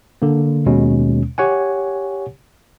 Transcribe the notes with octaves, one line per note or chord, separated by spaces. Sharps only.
D3 A#3
D#2 B2 G#3 C#4
G4 C#5 F#5 G#5